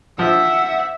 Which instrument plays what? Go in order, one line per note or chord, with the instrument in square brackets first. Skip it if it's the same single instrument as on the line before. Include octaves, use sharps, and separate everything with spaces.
[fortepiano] F3 [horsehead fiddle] E5 [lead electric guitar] F#5